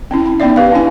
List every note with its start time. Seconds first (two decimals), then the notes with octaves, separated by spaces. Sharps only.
0.11 C4 C#4 E4
0.26 B5
0.40 B3 C#4 D#4 D5 E5
0.56 G4 B4 F5
0.71 C#4 D4 E4 G#5